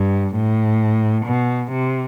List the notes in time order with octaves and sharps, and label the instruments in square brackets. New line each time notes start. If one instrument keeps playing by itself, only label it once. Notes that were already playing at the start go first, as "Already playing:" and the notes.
Already playing: [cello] G2
A2
B2
C3